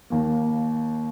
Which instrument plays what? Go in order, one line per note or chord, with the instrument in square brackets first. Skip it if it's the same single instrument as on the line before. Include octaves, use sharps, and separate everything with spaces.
[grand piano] D#2 D#3 A#3